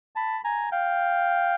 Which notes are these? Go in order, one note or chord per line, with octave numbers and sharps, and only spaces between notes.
A5 B5
G#5 A#5
F5 G5